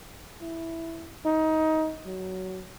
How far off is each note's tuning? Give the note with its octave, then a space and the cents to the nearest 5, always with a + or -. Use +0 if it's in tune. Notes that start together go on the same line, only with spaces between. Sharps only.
E4 +0
D#4 +20
F#3 +15